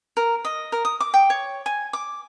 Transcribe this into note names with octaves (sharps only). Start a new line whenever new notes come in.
A#4
D#5
A#4
D#6
D6
G5
C#5
G#5
D6